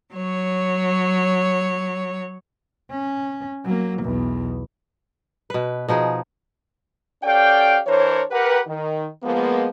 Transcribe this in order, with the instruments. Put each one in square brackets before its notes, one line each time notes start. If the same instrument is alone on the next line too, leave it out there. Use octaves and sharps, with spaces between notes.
[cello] F#3 C#5
[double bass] C#4
F#3 A#3
B1 E2
[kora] B2 B4
B2 F3 D#4 G#4
[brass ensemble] C#4 G4 A4 D5 F5 G5
E3 D4 A#4 C5 C#5
G4 A#4 B4 F#5
D#3
F3 G#3 A#3 B3